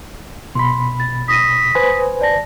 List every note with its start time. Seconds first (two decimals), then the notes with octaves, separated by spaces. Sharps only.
0.55 B2 B5 C6
1.00 A6
1.28 D#6 A#6 B6 D#7
1.75 B4 C5 G#5
2.21 D5 A5 A#6